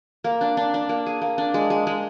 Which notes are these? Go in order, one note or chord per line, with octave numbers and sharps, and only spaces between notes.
A#3
D4
D4
D4
A#3
G#4
A#3
D4
G#3
G#3
G#3